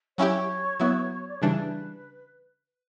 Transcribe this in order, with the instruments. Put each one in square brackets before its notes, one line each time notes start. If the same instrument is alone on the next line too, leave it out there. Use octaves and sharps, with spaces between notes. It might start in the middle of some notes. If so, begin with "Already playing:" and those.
[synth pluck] F#3 C#4 E4 G4 [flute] C#5
[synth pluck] F#3 B3 E4
[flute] D5
C#5
[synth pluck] C#3 E3 G3 D4 [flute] B4